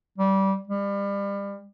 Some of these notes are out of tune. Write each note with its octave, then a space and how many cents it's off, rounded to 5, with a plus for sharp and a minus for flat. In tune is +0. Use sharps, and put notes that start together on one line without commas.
G3 -20
G3 +30